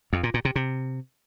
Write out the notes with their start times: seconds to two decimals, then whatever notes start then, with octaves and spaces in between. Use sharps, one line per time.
0.13 F2
0.23 A#2
0.34 A#2
0.45 C3
0.56 C3